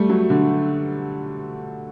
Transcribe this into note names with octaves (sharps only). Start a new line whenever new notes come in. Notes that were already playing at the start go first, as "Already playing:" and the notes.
Already playing: G3 A3
F#3
D3